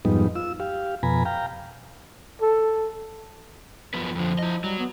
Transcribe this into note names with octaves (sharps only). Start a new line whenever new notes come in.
F2 G#2 G3 B3 D#4
F4 E6
G4 F5
F2 B2 G#5 A#5 B5
F5 G5 A#5
A4
F#2 F3 B3
F2 D3 F3
E4 D#5
F#3 G3
B3